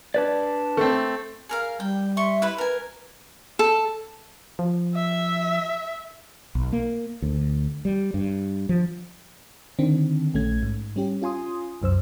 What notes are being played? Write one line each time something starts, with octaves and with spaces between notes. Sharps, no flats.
D4 B4 D5
A3 C4
G#4 A#4 F5
G3 G5
E5 C6 C#6
E4 B4 B5
A#4 B4 G#5
A4
F3
E5
B1
A#3
D2
G3
G2
F3
D3 D#3 C4 D4
A#1 A3 C#4 G#6
G#2
G3 C#4 G4
C#4 F4 G#5 C6 D#6
C2 F#2 C5 E6